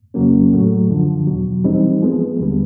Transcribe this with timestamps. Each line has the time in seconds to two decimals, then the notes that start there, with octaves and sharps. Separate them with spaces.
0.14 F2 C#3 F#3 A#3 C#4
0.52 A2 F#3 A3
0.90 F#2 D3 F3
1.27 E2 B2 F#3
1.64 E3 G3 C4 D#4
2.02 F3 G#3 B3
2.40 D#2 D3 G3 B3